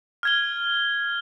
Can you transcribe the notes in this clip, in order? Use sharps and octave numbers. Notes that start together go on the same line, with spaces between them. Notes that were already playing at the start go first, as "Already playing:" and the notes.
F6 G#6 G7